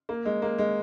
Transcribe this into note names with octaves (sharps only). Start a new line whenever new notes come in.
A#3
G#3
A#3
G#3